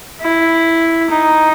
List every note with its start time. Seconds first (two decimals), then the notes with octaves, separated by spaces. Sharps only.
0.21 E4
1.10 D#4